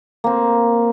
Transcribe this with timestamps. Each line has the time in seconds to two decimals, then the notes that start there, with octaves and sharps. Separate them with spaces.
0.24 A#3 C4